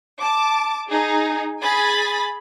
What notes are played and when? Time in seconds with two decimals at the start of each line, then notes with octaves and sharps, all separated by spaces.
0.21 A5 D6
0.88 D#4 G#4
1.61 G#4 G#5 B5 A6